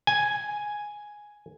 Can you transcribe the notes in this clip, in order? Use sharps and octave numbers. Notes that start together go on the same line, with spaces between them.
G#5